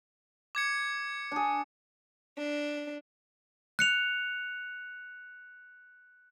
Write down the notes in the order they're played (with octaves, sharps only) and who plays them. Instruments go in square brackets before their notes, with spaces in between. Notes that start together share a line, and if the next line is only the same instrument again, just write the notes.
[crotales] D6 G#6 C#7
[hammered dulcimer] D4 G#4
[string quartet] D4
[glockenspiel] F#6 C#7 F7